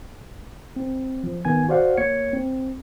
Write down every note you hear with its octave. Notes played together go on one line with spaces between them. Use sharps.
C4
F3
D#3 B3 G#5 G#6
F#4 C5 D5 F5 F#5
A#3 C#5 G#6 C#7
C4